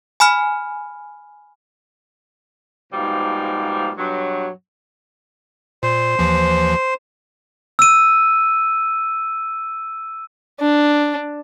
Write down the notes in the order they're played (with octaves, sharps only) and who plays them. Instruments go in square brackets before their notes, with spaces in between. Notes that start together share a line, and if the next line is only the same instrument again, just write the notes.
[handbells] G#5 B5 F6
[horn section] G#2 B2 F3 G3 A#3
G2 B2 F#3
[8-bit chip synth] A#2 [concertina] C5
[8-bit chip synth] D#2 E3 F3
[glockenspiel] E6 D#7
[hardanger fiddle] D4